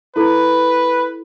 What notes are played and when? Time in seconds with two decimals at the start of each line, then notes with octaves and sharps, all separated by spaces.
0.16 E4 A4 B4